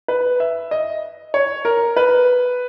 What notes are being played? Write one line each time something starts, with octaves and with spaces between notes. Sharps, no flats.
B4
E5
D#5
C#5
A#4
B4